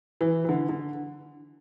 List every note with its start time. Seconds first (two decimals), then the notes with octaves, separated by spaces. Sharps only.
0.21 E3
0.45 E3
0.49 D3
0.69 D3